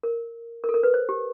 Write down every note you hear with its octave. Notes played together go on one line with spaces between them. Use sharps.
A#4
A#4
A4
A#4
B4
C5
G4